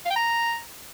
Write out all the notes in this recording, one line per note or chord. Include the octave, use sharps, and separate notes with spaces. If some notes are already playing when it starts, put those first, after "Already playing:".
F5
G5
A#5